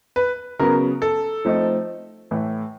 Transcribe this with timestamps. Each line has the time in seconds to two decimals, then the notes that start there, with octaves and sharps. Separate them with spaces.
0.16 B4
0.59 C#3 F#3 B3 A#4
1.02 A4
1.45 F3 A3 C4 D#4
2.31 A2 E3 A3